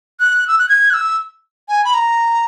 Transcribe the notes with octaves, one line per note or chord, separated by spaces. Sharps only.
F#6
E6
F#6
G#6
F#6
E6
G#5
B5
A#5